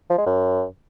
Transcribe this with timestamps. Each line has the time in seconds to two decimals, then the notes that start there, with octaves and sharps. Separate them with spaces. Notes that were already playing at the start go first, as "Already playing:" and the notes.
0.10 F3
0.18 G#3
0.26 F#2